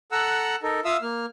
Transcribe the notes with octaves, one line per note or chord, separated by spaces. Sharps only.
A4 F#5 A#5 E6 F#6
D#4 A4 A#4
F4 E5 F5 D#6 E6
A#3 F6